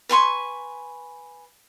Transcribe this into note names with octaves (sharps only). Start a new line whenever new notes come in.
B4 G#5 C6 C#6